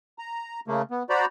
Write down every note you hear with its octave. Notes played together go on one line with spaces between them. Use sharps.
A#5
C#3 A3 A#3
B3
F#4 C5 D5 A#5 B5